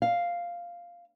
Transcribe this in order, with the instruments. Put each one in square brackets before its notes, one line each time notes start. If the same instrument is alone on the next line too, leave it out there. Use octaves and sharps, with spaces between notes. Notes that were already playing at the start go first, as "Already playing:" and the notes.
[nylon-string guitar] F5